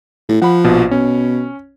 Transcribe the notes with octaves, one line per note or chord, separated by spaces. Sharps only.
A2
F3 F#5 B5
A#1 B2
B2 C#4